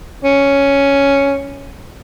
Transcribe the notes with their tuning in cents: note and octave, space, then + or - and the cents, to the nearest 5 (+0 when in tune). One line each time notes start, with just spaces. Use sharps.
C#4 +5